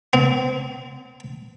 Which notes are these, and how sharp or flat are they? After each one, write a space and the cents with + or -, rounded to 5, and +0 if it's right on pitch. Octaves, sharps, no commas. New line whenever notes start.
C4 -35